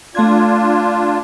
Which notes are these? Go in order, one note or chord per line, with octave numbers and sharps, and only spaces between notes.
A3 D4 F4 G#6